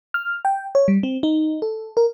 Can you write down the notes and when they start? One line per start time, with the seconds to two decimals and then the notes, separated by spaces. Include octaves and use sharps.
0.14 F6
0.45 G5
0.75 C#5
0.88 G3
1.03 C4
1.23 D#4
1.62 A4
1.97 A#4